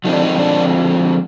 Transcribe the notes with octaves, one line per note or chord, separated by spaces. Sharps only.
D3 F3 G#3 C4 D#4
D4
D#4
D4